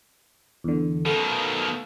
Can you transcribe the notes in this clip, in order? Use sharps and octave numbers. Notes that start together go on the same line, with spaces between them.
E2 D3
B2 D#3 A3 F5